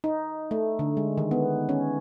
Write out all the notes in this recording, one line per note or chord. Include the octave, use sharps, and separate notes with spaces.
D#4
A3
D3
G#3
D#3
B3
C#4